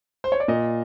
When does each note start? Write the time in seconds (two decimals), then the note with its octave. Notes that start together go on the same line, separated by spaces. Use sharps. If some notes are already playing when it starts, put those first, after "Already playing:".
0.24 C5
0.32 C#5
0.40 D5
0.48 A#2 D#5